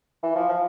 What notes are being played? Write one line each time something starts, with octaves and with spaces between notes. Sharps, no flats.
E3
F3
F3